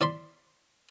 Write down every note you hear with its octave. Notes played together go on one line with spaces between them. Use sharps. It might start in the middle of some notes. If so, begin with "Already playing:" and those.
E4 D5 B5 C6